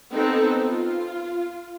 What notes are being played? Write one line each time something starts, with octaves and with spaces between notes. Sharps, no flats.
B3 C4 D#4 A4
F4